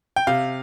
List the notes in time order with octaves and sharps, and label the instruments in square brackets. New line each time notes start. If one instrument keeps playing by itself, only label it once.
[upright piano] G5
C3 F5